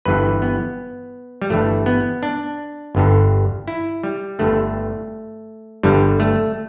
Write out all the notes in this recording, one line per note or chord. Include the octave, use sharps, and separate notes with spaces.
G1 G2 E3 B4
B3
G3
G1 G2 E3 A3
B3
D4
G1 G2 D3
E4
G3
G1 G2 D3 A3
G1 G2 D3 G3
A3